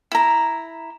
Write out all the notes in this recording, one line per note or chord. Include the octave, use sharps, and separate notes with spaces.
E4 A#5